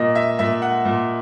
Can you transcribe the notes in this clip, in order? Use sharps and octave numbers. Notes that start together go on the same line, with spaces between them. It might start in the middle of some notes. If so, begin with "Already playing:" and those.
Already playing: A#2 D#5
E5
A#2 E5
F#5
A#2